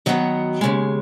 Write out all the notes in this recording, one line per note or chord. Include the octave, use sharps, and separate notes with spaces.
D#3 F#3 B3
D#2 C#3 G#3